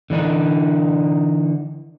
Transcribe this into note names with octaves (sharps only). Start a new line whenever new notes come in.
D3 E3 D4 D#4